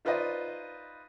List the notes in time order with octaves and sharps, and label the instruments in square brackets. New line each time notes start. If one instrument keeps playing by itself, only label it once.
[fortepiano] D#4 F4 B4 C5 D5 D#5